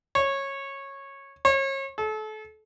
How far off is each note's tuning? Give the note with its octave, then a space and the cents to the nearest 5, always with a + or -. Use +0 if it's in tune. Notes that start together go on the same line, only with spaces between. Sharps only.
C#5 -15
C#5 -35
A4 -30